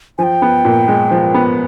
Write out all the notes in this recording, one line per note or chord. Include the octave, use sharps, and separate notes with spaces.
F3 G5 G#5
B3
A#2
G#3
F3
B3